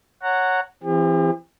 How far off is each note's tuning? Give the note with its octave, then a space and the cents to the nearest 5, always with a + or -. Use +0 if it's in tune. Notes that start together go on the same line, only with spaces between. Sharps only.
C#5 +0 F#5 +0 A#5 -20
E3 +25 C4 +0 G4 +45